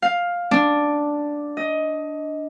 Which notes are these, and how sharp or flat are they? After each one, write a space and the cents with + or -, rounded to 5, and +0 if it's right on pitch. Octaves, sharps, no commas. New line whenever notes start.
F5 +10
D4 +0
D#5 +15